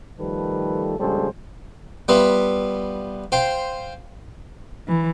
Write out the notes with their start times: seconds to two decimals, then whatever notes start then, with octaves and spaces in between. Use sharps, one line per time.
0.19 D#3 F3 G3 A3 A4 B4
0.99 A#1 C#3 G3 G#3 A4 C5
2.08 G3 B3 F4 B4 E5
3.32 F4 C5 G5
4.87 E3